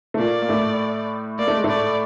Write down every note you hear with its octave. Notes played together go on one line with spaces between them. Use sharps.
A3
A#2 A#3 D5
A#3
A2 A3
A#3 D5
A3
G#3
A2 A3 D5